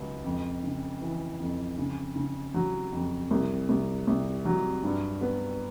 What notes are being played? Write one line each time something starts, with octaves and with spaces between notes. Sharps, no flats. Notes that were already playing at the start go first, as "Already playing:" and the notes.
Already playing: C#2 F#3
F2
C#3
E3
F2
C#3
C#3
F#3
F2
C2
C2
C2
F#3
G2
B3